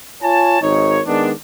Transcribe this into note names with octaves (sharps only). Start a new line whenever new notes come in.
F4 C#5 G#5 A5
G#1 D#3 D#4 C#5
D#3 G#3 B3 D4